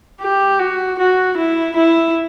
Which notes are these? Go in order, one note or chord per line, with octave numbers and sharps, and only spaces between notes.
G4
F#4
F#4
E4
E4